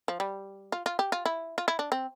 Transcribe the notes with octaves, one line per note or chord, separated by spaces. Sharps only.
F3
G3
F4
F4
G4
F4
E4
F4
E4
D4
C4